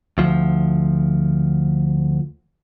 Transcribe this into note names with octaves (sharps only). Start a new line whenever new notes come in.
D2 F3